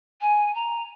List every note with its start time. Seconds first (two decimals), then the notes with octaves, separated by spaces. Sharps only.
0.21 G#5
0.55 A#5